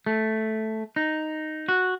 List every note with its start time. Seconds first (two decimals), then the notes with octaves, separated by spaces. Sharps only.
0.06 A3
0.96 D#4
1.69 F#4